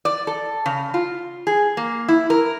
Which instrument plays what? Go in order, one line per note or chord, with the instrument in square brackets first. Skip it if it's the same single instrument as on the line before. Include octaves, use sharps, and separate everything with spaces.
[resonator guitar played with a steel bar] D5
A4
C#3
F4
G#4
A#3
E4
A#4